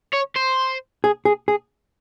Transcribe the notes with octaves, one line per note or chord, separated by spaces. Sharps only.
C#5
C5
G#4
G#4
G#4